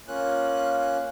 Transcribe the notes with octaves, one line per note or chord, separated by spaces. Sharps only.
A#3 C#4 F4 F#6